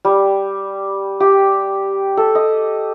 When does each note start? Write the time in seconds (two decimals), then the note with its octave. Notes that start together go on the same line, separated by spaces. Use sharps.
0.05 G3
1.20 G4
2.17 A4
2.35 D#5